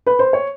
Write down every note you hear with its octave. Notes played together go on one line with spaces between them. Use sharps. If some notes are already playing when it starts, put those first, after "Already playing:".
B4
C5
C#5